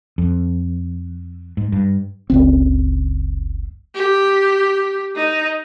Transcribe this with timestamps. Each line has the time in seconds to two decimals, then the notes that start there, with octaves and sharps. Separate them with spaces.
0.18 F2
1.57 G#2
1.72 G2
2.30 F#1 C#2 C4
3.95 G4
5.16 D#4